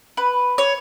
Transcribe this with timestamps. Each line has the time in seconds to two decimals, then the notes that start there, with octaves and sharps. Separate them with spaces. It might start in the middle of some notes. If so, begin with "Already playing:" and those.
0.17 B4
0.58 C#5